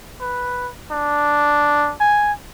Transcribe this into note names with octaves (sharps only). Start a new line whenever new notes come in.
B4
D4
G#5